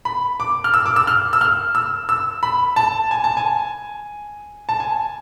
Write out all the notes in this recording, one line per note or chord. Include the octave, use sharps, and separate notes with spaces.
B5
D6
F6
E6
D6
E6
F6
E6
F6
E6
E6
B5
A5
G#5
A5
G#5
A5
G#5